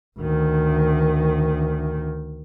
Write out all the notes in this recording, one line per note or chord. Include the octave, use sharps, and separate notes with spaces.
D2 D#3